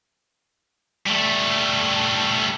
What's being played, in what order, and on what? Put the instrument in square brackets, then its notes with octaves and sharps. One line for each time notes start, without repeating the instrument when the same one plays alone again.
[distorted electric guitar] G3 A3